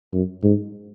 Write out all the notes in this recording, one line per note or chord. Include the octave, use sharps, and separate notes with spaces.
F#2
G#2